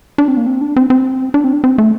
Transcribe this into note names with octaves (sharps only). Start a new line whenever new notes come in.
D4
C4
A#3
C4
D4
C4
C4
D4
C4
D4
C4
A3